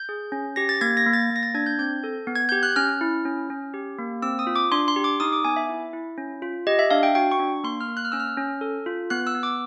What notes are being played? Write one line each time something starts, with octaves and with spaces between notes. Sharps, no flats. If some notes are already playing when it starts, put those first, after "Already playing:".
Already playing: G6
G#4
C#4
G4 A#6
A6
A#3 G#6
A#6
A#3
A6
A#3
A#6
A6
D4 G#6
G6
C4 G6
A4
B3
G#6
G4 G6
F#6
C#4 F6
E4
C#4
C#4
G4
A#3
C4 E6
D#6
F4
D6
D4 C6
C6
G4
D6
D#4 D#6
D6
B3 G#5
E5
E4
E4
C#4
F4
G4 D#5
E5
D4 F5
G5
F#4 G5
C#6
D4
A#3 C6
F6
A#3
F#6
F6
C#4 E6
F6
C#4
A4
F4
B3 F#6
E6
B3
D6